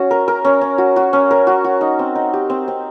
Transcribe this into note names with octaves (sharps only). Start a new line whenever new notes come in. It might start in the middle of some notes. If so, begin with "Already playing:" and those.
Already playing: C#4 F#4
A#4
A#4
C#4
C#4
F#4
F#4
C#4
A#4
F#4
F#4
D#4
C4
D#4
G4
C4
C4